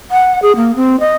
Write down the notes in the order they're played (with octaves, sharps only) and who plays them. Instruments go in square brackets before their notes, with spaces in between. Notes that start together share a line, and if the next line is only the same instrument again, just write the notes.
[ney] F#5
G#4
A#3
C4
D#5